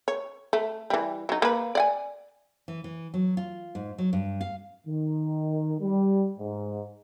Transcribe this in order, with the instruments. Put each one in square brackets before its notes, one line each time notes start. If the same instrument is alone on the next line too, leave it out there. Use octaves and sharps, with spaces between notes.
[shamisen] C#5
A3
E3 G3
F#3 D#4
A#3 B4
D5 F#5 G#5
[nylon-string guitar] E3
E3
F#3
F4
G#2
F#3
G2
F5
[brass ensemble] D#3
G3
G#2